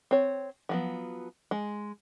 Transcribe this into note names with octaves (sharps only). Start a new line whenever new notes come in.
C4 C#5
F3 F#3 B3
G#3